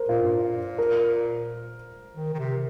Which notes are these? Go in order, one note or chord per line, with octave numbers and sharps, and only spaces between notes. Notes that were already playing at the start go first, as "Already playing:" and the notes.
Already playing: A#4 C5
A#2 F4
G2
A#2
A#4
D#3
D#3
C3